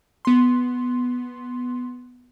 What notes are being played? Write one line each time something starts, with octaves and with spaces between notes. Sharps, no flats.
B3 C6